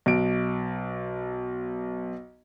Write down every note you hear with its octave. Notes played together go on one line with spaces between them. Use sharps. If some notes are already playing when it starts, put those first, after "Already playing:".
B1 D7